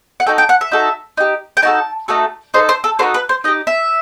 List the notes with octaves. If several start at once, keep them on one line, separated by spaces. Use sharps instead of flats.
F#5
D#4 F#4 A4 G5
G5
F#5
E5
D#4 F#4 A4
D#4 G4
G5
D#4 F#4 A4 A5
A3 D#4 F#4 A4
D#4 A4 C5
C5
A4
D#4 F#4 A4 C5
B4
C5
D#4 G4 D#5
E5